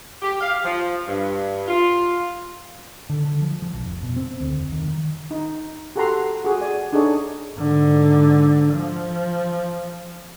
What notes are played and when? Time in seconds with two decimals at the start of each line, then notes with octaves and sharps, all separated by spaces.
0.23 G4
0.41 F5
0.65 F3
1.07 G2
1.68 F4
3.10 D3
3.25 D3
3.42 F3
3.62 F3
3.74 B1
3.86 F1
4.03 B2
4.16 C4
4.41 D2
4.56 F1
4.72 D#3
4.88 D#3
5.31 D#4
5.96 F#4 G4 A4 F#5 A#5 C6
6.45 F#4 G#4
6.61 D5 G#5
6.93 D4 D#4 G#4 A4 C#5 D5
7.56 G#2 D3
8.74 F3